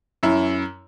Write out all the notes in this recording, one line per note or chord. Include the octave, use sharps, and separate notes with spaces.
F#2 E4